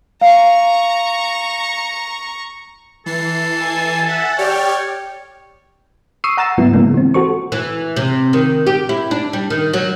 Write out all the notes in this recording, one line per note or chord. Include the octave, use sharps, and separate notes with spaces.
F5 A#5 C#6
E3 A4 C7
G#5
E5 F#5
G4 C#5 D5 G5 F6
C#6 D#6 E6 C7 D#7
F#5 A#5 E6 A6 E7
G#2 C#3 F#3 B3 E4
C#3 G#3 A#3 B3
E3 C4
F#4 A4 C5 C#6
E3
C3
D#3
G4
E4
D4
G3
D#3
F#3